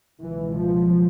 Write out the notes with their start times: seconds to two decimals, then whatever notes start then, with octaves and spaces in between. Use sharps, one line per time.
0.20 C#2 B2 E3
0.56 F3